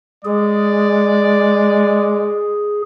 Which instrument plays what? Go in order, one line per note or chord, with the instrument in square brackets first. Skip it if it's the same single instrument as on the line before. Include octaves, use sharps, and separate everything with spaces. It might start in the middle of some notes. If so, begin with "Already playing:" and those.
[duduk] G#3 [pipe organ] G#4 [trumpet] D5